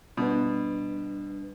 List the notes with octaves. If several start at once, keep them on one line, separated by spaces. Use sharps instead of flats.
B2 G3 D4 B4